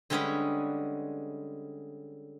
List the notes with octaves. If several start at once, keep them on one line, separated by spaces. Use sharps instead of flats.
D3 G3 G#3 C#4 G#4 B4